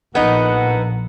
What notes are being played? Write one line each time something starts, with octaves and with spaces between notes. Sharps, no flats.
A#1 B3 D#4 F#4 A4 F#5